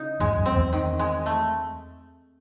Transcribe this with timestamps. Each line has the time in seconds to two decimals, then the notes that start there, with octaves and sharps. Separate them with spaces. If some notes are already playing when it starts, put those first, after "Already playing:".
Already playing: C#3 D#4
0.20 E2 G#2 G#3
0.37 F#2
0.46 C4
0.55 E2
0.73 D#3
0.99 G#3
1.26 A3